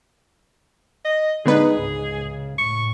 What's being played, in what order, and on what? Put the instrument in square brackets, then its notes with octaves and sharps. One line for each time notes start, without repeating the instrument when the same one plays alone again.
[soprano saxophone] D#5
[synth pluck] D3 B3 B4 [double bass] G#3 D#4 [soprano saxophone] G#4
[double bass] C#2 G#2
C#3
[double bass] A2 [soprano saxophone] C#6